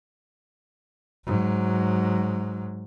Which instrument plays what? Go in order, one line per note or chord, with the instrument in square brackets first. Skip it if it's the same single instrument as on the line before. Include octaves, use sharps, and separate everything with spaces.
[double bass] G#2 F#3